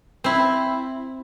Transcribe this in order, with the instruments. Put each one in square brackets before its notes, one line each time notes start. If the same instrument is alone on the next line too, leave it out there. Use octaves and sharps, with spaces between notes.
[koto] C4 E4